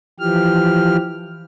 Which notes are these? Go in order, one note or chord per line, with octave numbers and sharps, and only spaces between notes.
E3 F3 G4 F6